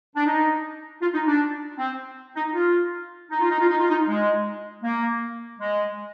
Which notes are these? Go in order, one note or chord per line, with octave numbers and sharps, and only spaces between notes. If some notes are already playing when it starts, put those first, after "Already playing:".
D4
D#4
F4
D#4
D4
C4
D#4
F4
D#4
F4
D#4
F4
D#4
F4
D#4
G#3
A#3
G#3